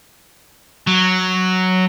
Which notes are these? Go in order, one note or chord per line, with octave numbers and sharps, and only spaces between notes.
F#3